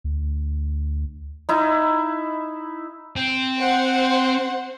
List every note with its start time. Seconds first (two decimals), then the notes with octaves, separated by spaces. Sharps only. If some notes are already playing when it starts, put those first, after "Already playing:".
0.04 D2
1.49 D#4 E4
3.16 C4
3.57 C5 F#5